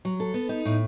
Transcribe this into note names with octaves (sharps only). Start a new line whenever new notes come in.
F#3
A4
B3
D#4
A2